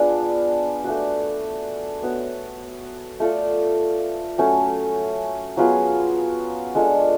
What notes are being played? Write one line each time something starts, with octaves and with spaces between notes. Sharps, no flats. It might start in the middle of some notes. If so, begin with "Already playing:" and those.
Already playing: B3 D4 F4 G#4
A3 D4 F#4
B3 F#4 C#5
A3 F4 A4 D5
F#3 A3 C#4
F#3 B3 F4 G#4
G#3 D4 F4 A4